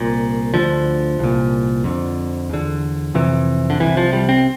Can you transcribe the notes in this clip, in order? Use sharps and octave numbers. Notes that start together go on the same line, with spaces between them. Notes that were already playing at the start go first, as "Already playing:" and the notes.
Already playing: C2 A#2
D2 D3 F3
C2 A#2
F2 D3
E2 D3
F2 C3 E3
D3
C2 C3 E3
F3
G3
C4